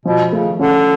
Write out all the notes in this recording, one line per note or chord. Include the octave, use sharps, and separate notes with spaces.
B2 F3
C#3 A3
D3 C#4